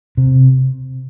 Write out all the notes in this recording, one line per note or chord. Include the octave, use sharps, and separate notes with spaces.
C3